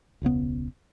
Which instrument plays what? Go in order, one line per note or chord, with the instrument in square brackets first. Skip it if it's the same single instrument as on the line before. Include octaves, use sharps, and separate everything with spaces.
[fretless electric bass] E1 C#2 C#3 B3